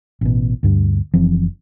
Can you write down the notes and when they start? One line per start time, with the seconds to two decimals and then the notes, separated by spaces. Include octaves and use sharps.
0.21 A1 B2
0.63 D2 G2 G3
1.14 F#1 E3 F3 C4